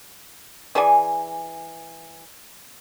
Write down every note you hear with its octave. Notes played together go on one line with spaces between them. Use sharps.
E3 G#4 D5 G#5